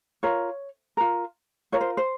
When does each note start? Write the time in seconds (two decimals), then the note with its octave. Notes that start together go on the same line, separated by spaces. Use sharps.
0.23 F4 A#4 C#5
0.97 F4 A#4
1.72 F4 A#4 C#5
1.81 C5
1.97 C5